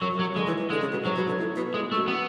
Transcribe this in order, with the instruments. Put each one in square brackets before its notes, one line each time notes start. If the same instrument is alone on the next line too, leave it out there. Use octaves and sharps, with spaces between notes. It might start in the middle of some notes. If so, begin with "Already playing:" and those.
[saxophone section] F#2 [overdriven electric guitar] F#3
[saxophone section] F#2
[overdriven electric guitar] F#3
[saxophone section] F#2
[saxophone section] D3 [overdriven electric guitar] G#3
[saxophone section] E3
E3
[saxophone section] D3 [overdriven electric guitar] G#3
[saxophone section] C#3
B2
[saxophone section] G#2 [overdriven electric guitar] F#3
[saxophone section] B2
D3
A2
B2
[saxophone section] A2 [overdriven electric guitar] G#3
[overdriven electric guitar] A3
[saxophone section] F#2
[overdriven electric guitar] B3